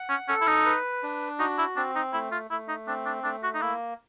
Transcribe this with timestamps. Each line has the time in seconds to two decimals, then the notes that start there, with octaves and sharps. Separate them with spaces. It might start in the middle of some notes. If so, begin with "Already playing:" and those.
Already playing: F#5
0.10 C#4
0.28 C#4 A4
0.41 E4
0.47 D#4
0.66 B4
1.03 D4
1.39 D#4 F#4
1.58 E4
1.76 C4 D4
1.96 D#4
2.13 A3 E4
2.32 F4
2.51 A3 E4
2.68 D#4
2.87 C4 D4
3.06 D4
3.24 A3 D4
3.43 F#4
3.54 D#4
3.61 A#3 E4